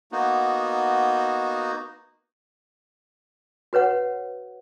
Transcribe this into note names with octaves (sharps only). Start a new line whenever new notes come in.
A#3 B3 D#4 F#4
F#4 B4 C#5 F#5